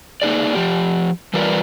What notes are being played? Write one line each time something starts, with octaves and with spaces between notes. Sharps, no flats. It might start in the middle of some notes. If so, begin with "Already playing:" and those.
A#3 D#4 G#4 D5
F3 G4
E3 G3 F4 A#4 B4 D5